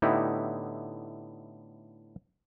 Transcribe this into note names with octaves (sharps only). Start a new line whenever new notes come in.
A2 D3 B3 D#4 E4 G4